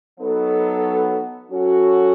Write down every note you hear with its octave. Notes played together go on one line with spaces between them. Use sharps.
F#3 B3 D#4 A4
F#3 C#4 F#4 A4